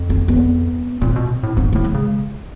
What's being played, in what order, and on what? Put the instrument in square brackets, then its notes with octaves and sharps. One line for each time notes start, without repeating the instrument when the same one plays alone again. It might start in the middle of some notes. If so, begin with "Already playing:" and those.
Already playing: [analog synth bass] F2
[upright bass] C4
B3
[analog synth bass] A#2 [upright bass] C4
[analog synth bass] B2
A2
[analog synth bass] G#2 [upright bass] C4
[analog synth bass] A2 [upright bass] A3
[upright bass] G#3
[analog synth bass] C#3